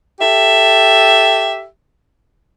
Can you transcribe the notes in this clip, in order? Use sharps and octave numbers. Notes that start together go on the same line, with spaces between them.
G4 A4 E5